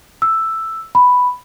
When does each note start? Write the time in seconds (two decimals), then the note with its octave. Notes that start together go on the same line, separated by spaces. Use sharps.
0.22 E6
0.95 B5